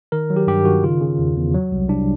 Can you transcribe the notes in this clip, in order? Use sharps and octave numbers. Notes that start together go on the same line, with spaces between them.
D#3 A#4
F#3
G4
G2 G4
D#3 F#4
C#3 F4
C#3
E2
E2
F#3
C2
C2 D4